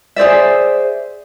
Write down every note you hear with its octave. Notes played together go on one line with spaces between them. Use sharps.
G#4 C5 D5 E5